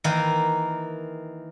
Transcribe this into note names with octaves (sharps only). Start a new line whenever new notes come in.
D#3 E3 A#3 D#4 E4